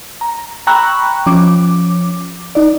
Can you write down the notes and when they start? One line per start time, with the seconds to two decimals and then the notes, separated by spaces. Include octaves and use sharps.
0.21 A#5
0.67 G5 A#5 B5 C#6 E6 F#6
1.26 F3 C#4 D6
2.55 D#4 D5